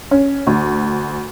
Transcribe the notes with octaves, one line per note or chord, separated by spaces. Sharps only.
C#4
D2